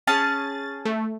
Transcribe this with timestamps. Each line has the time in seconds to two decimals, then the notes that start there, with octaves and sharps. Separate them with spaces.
0.07 C#4 G#4 A5 A6
0.85 A3